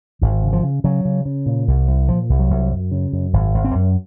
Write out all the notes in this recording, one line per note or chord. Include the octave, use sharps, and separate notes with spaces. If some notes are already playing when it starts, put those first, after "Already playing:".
G#1 D#3
C#3
F3
C#3
C#3 F#3
C#3
C#3
A#2
C2
C2
A#2 F3
C2
F#3
C2
F#2
C#3
F#2
G#1
G#1
C4
F#2